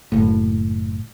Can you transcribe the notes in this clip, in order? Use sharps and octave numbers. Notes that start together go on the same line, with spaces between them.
F#1 A2